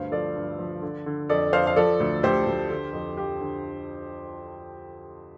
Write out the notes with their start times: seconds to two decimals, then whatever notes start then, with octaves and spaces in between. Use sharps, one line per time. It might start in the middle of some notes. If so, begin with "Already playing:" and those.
Already playing: D2 G2 C5 F5
0.12 F3 A4 D5
0.36 G2
0.59 F3
0.82 D3
1.06 D3
1.29 F2 A4 D5
1.53 F2 C5 F5
1.67 F5
1.76 F3 A4 D5
2.00 D2
2.23 D2 G4 C5
2.46 D2
2.70 D3
2.93 F2
3.17 F3 G4
3.41 D3